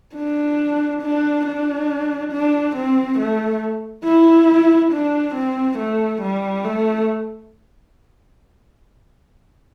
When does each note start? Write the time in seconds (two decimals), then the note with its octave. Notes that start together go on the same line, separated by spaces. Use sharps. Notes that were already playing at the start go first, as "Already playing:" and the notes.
0.16 D4
1.02 D4
1.46 D4
2.32 D4
2.76 C4
3.19 A3
4.05 E4
4.92 D4
5.35 C4
5.78 A3
6.22 G3
6.64 A3